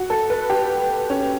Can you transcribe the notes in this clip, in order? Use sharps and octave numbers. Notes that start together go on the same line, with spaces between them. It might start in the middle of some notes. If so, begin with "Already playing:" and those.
Already playing: F#4
A4
B4
G4
C#4